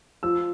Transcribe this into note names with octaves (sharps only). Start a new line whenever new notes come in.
F3 E6